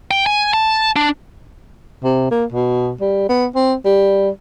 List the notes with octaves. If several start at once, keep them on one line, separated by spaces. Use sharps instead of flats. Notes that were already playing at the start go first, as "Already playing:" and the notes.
G5
G#5
A5
D4
C3
A#3
B2
G3
B3
C4
G3